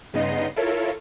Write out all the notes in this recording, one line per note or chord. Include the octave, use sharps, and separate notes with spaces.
G2 C#3 B3 D#4 D#5 C6
E4 F4 A4 A#4 C#5